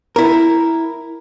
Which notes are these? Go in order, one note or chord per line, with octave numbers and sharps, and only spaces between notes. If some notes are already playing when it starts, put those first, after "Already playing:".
E4 A#4